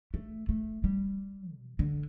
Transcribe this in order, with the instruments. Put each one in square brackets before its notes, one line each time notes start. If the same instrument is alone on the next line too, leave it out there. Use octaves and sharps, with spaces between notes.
[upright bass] A3
A3
G3
B2
D3